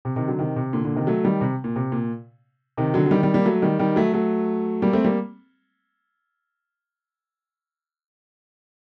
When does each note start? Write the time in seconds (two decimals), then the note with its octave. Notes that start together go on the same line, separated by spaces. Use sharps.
0.05 C3
0.16 C3 D#3
0.28 D3 F#3
0.39 C3 D#3
0.56 C3
0.73 A#2 D3
0.84 A#2 D3
0.96 C3 D#3
1.07 F#3 A3
1.24 D#3 G3
1.41 C3
1.64 A#2
1.76 C3
1.92 A#2
2.77 C3 D#3
2.94 D3 F#3
3.06 F#3
3.11 D#3 G3
3.23 D#3 G3
3.34 G3 A#3
3.45 F#3 A3
3.62 D#3 G3
3.79 D#3 G3
3.96 F#3 A3
4.14 F#3 A3
4.82 G3 A#3
4.93 A3 C4
5.04 G3 A#3